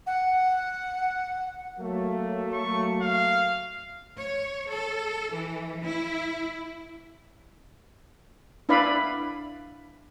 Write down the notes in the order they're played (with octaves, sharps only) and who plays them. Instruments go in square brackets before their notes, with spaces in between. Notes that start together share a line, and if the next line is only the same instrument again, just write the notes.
[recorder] F#5
[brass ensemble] F#3 A3 A#3
[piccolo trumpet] C#6
F5
[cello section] C#5
A4
E3
E4
[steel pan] D4 E4 B4 D5 F5 B5